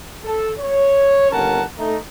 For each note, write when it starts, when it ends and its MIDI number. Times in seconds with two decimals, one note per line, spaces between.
0.24 0.50 69
0.59 1.28 73
1.30 1.61 31
1.30 1.61 39
1.30 1.61 61
1.30 1.61 70
1.30 1.61 78
1.30 1.61 81
1.78 1.97 57
1.78 1.97 63